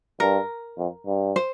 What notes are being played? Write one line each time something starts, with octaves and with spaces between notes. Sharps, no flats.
G2 A#4
F2
G2
C5